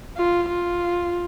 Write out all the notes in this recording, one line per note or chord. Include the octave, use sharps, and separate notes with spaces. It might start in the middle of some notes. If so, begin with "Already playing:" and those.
F4
F4